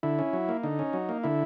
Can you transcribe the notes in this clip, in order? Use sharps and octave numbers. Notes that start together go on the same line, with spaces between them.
D3 E4
C#4
F#3
A#3
D3 D#4
C#4
F#3
A#3
D3 E4